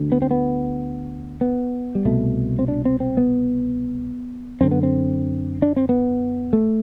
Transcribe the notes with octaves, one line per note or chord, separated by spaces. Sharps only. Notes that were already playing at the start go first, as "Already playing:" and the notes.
Already playing: D2 D3
B3
C4
B3
B3
G3
C2 B2 A3
C4
D4
C4
C4
B3
F#2 D3 C4
B3
C4
D4
C4
B3
A3